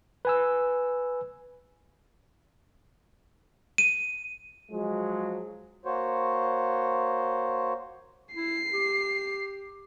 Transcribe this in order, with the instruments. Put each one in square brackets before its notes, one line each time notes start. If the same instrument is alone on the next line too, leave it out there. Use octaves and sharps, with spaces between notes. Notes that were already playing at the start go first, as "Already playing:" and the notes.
[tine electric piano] B4 G#5 E6
[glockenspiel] D#7
[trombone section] F3 F#3 G#3
[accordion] A#3 F#4 C5 C#5
[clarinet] E4 [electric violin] C7
[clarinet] G4